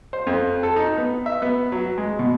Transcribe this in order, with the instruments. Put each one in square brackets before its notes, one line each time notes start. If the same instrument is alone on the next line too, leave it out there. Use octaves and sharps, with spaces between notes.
[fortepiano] C5
F2
A4
D#4
B3
E5
B3
F#3
G#3
B2